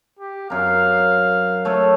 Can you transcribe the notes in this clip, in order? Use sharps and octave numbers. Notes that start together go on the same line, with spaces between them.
G4
F#2 A#4 F5
A3 C#5